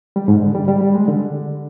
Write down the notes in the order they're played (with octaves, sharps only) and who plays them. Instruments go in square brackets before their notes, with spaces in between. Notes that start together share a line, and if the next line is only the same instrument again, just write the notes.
[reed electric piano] G3
G#2
D3
G3
G3
G3
G#3
D3